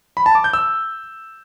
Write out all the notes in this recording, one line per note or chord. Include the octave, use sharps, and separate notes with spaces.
B5
A5
D6
G6
E6